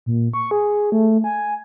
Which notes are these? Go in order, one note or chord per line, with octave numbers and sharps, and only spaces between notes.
A#2
C#6
G#4
A3
G#5